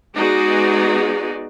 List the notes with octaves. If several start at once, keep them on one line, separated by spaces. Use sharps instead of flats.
G#3 B3 D#4 F#4 G#4 D5